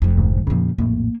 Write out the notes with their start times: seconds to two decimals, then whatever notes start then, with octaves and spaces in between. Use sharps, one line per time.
0.02 F1 F2
0.16 E1 D2 G#2
0.47 F2 A#2 C#3 F3
0.78 A#1 F2 A2 A#3